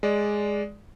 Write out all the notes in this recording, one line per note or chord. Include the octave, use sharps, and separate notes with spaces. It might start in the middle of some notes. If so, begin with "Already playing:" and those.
G#3 D5